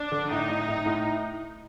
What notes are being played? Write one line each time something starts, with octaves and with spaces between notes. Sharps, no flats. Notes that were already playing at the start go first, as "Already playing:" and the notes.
Already playing: D4
D3
A2 D#4
A2
A2
A2